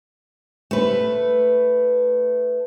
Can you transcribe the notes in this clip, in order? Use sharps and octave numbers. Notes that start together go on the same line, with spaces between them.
A3 B4